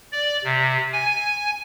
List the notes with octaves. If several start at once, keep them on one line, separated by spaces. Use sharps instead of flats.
D5
C3
G#5